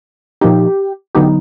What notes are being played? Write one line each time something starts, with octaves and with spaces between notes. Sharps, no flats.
A#2 F3 A#3 D#4 G4
D3 F#3 B3 D#4 G4